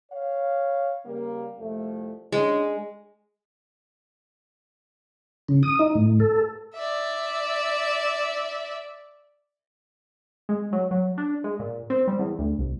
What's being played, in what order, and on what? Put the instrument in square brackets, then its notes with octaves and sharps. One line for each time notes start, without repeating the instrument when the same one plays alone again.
[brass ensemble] C#5 F5
C#3 G3 A#3
C2 F2 A3
[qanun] G#3 [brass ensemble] C#4 D4
[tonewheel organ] C#3
D#6
D#4
A2
A4
[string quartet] D5 E5
[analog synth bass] G#3
F#3
F#3
D4
G#3
A#2
C4
G3
E2
D2
C2